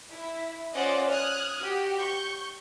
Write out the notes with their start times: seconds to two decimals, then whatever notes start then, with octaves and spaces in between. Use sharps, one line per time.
0.12 E4
0.74 C#4 F4 C5 D5 D#5 F#5
1.10 D#6 F6 F#6 G#6
1.60 F#4 G4
1.98 C#6 G6